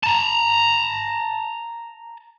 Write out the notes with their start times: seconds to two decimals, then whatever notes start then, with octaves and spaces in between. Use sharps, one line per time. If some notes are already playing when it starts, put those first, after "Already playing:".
0.03 A5 A#5